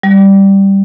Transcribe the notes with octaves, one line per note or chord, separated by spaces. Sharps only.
G3